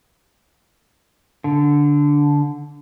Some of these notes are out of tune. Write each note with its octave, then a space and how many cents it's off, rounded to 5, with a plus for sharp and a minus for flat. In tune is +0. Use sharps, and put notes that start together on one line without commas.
D3 -10